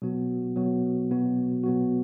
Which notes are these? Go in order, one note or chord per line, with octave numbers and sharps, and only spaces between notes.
B2 F#3 B3 F#4
B2 F#3 B3 F#4
B2 F#3 B3 F#4
B2 F#3 B3 F#4